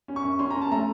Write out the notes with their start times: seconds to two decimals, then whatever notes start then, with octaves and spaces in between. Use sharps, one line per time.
0.08 C#4
0.16 C#6
0.24 F#2
0.39 C#4 C6
0.50 C#4 A#5
0.61 A5
0.71 A3 A#5